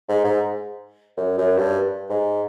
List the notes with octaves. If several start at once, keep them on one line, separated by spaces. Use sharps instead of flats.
G#2
G#2
F#2
F#2
G2
G#2